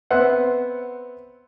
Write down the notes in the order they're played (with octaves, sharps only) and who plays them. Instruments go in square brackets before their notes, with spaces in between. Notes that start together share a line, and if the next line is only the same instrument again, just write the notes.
[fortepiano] B3 C4 C5 E5 F#5